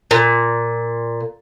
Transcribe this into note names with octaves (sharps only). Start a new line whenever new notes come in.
A#2